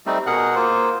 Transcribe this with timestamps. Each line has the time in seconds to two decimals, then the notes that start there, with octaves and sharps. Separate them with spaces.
0.06 G3 A3 C4 D#4
0.26 B2 G#4 A#4 F#5 F#6
0.55 A#3 F4 C5